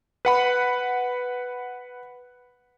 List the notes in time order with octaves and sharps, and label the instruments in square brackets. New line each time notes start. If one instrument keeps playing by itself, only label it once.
[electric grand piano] B4 F#5 B5